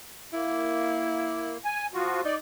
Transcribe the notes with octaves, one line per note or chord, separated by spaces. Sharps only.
A#3 E4
G#5
F3 F4 F#4
D#4 D5